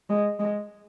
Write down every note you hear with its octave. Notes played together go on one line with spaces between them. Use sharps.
G#3
G#3